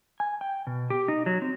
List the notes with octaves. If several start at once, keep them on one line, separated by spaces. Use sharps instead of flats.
G#5
G5
B2
G4
D#4
F#3
C4